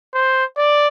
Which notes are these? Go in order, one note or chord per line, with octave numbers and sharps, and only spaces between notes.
C5
D5